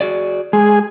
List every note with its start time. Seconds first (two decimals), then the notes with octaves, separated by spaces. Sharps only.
0.01 F#4 G#4 D5
0.53 G#3 G#4